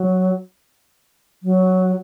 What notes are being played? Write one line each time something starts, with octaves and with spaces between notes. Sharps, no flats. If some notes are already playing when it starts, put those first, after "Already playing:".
Already playing: F#3
F#3